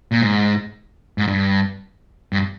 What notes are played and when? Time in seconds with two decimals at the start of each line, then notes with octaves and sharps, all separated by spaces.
0.12 A#2
0.22 G#2
1.18 G#2
1.27 G2
2.33 G2